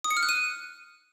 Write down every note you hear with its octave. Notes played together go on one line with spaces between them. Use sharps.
D#6
C#7
F6
F#6
D#7